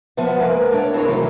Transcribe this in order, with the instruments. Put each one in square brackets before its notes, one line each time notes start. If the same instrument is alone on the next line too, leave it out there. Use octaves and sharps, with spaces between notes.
[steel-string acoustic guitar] F3 B3 F4 B4 E5 F#5
G#3 A#3 A#4 B4
D4 C#5
C4 E4 G#4 A#4 C#5
G#2 C3 D#3 E3 F#3 A3